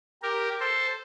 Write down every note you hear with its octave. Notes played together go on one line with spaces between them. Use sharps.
G4 A#4
A4 C5